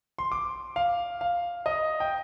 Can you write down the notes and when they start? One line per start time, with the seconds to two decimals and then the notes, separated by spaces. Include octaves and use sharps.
0.18 C6
0.32 D6
0.76 F5
1.21 F5
1.66 D#5
2.00 G5